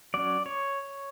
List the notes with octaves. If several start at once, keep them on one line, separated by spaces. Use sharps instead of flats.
F#3 C#4 D5
C#5